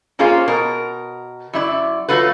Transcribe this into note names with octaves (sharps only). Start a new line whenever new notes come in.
A#3 C#4 F4 G#4 C5 F5
B2 A#4
F#2 E4 D5
F#3 A3 F4 B4